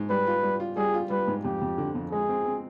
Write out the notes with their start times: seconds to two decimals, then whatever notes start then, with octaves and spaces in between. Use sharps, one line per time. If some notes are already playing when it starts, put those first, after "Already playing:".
Already playing: G#2
0.10 G3 B4
0.27 F4
0.43 G3
0.60 F4
0.77 G3 G#4
0.94 F4
1.10 G3 B4
1.28 G#2
1.44 F2 G4
1.62 F2
1.78 D3
1.95 F2
2.11 G#3 G#4
2.29 C4
2.45 C4